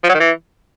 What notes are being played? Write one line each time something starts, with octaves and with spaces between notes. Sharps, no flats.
F3
F#3
D#3
E3